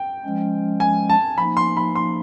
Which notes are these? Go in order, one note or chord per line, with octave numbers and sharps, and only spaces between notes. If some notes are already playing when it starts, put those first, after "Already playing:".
Already playing: G5
F3 G#3 C#4
G#5
A5
F3 A#3 D#4 B5
C6
B5
C6